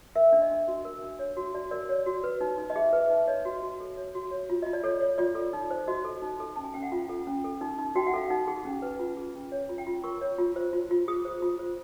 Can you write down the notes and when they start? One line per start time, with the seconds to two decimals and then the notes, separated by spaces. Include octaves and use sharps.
0.15 A#4 E5
0.32 D4
0.42 D#5
0.51 D4
0.68 F#4
0.85 A#4
1.02 D4
1.19 C#5
1.37 F#4
1.55 F#4 D5
1.71 A#4 D5
1.89 C#5
2.06 F#4
2.24 B4
2.41 D#4
2.58 D#4
2.70 D#5
2.76 G#4 E5
2.93 B4
3.02 E5
3.10 D#4
3.28 C#5 D#5
3.45 F#4
3.63 F#4
3.80 A4
3.97 C#5
4.15 F#4
4.31 C#5
4.50 F4
4.62 F4 D#5
4.73 D5
4.84 A4 C#5
5.01 C#5
5.18 F4 D5
5.35 A4
5.53 D#4
5.70 C5
5.88 F#4 D#5
6.04 A4
6.22 D#4
6.40 A4
6.56 C#4 A5
6.64 G#5
6.74 C#4 G5
6.82 F#5
6.92 F4 F5
7.09 A4
7.27 C#4
7.44 A4
7.61 D#4
7.79 D#4
7.95 F#4 G5
8.07 F#5
8.14 A4 F5
8.27 D#4 F#5
8.48 G#4
8.65 C#4
8.82 B4
8.99 F4
9.17 G#4
9.34 C#4
9.52 C#5
9.69 F4
9.78 G5
9.87 F4
10.04 A#4 C#6
10.21 C#5
10.39 F4
10.56 C5
10.73 F4
10.91 F4
11.08 G#4 D#6
11.25 C5
11.42 F4
11.59 C5